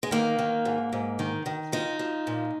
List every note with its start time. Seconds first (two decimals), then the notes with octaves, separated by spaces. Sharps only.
0.03 G#3
0.11 D#3 A#3
0.39 D#3
0.65 G#2
0.93 G#2
1.19 D#3
1.46 D#3
1.72 F3 D#4
1.99 F3
2.27 A#2